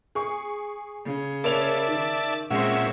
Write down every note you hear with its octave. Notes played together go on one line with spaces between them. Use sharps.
G#4 C#6
C#3
A#3 C#5 D5 E5 A5 F7
D#3
A#2 G#3 C4 C#4 E5 F#5